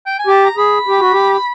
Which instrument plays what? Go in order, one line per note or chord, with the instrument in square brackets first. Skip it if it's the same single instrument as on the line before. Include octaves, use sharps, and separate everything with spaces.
[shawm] G5
G#5
[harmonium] G4 [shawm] A5
[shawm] A#5
[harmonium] G#4 [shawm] B5
[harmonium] G4
F#4
G4